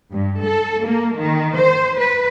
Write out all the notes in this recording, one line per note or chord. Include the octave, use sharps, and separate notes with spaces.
G2
A4
A#3
D#3
C5
B4